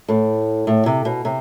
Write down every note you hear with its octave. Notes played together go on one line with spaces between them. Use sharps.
A2
A2
C3
B2
C3